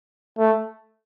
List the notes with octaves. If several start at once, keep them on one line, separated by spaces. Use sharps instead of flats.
A3